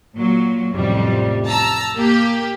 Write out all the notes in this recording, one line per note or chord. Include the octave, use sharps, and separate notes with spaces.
A#2 F#3
A1 F2 C3 G3
A5 A#5 E6
A#3 G4